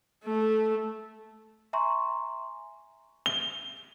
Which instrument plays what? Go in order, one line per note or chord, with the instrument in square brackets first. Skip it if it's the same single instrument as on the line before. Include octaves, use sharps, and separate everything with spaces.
[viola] A3
[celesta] E5 G#5 A#5 C6 C#6
[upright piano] G7